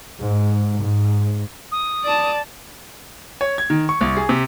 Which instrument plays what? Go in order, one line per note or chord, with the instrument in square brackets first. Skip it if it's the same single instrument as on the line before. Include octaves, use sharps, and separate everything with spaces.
[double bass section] G#2
G#2
[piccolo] D#6
[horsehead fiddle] D5 A5
[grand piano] C#5
G#6
D#3
C#6
C2
G#4
C3